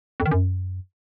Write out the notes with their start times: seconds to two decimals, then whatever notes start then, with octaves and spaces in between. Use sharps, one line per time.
0.20 F2
0.26 D#3
0.31 F#2